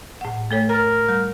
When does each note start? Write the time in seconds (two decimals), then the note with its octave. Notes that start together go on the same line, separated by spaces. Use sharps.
0.21 A2 F#5
0.51 A3 A4 C#5
0.69 A#4 A#5 A6
1.09 G3